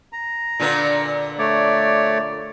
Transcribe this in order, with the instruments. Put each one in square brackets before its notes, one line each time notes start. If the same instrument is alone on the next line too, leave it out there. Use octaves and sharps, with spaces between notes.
[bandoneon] A#5
[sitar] A#2 D3 B3
[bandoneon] A3 C#5 D5